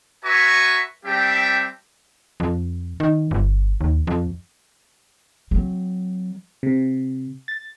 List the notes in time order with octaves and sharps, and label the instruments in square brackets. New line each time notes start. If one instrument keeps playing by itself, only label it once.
[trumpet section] F#4 B4 E5 G#5 A#5 C#6
G3 C4 G4 E5 G5 A5
[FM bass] F2
D#3
G1
D#2
F2
[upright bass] F#3 C4
[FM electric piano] C3
A6